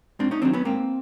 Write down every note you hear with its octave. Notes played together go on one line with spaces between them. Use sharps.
G#2 C4 D4
C#4 D#4
D#3 F#3 C4 D4
B3 C#4
G#2 A#3 C4